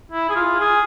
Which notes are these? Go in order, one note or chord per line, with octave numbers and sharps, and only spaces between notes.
E4
G#4
F4
G#4